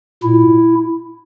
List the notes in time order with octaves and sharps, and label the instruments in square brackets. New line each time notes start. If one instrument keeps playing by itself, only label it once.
[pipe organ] A#2 E4